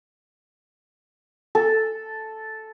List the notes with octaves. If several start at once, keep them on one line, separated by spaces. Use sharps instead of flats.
A4